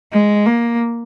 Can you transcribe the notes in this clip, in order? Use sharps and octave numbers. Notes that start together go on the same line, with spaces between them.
G#3
A#3